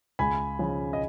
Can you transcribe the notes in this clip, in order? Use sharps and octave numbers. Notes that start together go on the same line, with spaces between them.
C#2 G#5 B5
C#3 F3
D#5